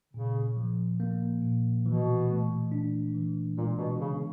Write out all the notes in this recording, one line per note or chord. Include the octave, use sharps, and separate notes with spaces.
A#2 C#3
F3
A#3
A#2
B2 E3
A3
D4
E3
A#2 G#3
B2
C#3 B3